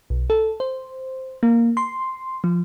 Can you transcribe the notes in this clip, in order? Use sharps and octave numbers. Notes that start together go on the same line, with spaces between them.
B1
A4
C5
A#3
C6
F3